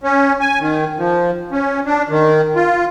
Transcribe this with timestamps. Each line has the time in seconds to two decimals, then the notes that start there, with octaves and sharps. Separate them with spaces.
0.03 C#4
0.40 G#5
0.60 D#3
0.98 F3
1.52 C#4
1.85 D4
2.09 D#3
2.55 F4